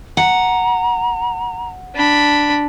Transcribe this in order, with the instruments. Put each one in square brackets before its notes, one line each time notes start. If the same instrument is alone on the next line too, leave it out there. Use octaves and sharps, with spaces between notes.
[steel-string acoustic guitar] F#5 [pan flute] A#5
[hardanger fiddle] D4 B5